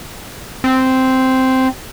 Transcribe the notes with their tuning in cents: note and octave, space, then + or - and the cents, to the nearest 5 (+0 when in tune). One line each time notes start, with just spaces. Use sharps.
C4 -5